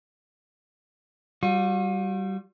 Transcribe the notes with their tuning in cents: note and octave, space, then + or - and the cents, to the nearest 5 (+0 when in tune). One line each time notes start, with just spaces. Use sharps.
G3 -20 F4 +45